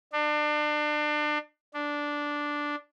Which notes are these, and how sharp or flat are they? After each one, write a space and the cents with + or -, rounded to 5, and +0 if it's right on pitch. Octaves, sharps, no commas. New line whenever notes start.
D4 +30
D4 -5